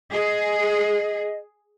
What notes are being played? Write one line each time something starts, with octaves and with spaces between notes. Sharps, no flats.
G#4 D#5